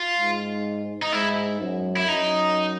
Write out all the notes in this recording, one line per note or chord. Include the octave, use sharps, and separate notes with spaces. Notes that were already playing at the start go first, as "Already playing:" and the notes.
Already playing: F4
G#2
D#4
G#2 E4
F#2
E4
F#2 D#4